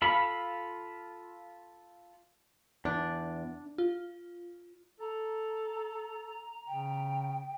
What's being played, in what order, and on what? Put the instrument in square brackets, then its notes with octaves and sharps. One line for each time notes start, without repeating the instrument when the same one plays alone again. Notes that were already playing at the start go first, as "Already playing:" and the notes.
[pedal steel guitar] F4 A4 F5 B5
[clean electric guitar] E2 [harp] D4
[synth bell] F4
[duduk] A4 [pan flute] A#5
[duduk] C#3 [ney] G5